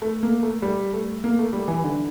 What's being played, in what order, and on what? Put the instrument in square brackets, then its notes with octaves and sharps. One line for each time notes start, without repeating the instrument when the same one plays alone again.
[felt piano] A3
A#3
A3
G3
A3
A#3
A3
G3
E3
D3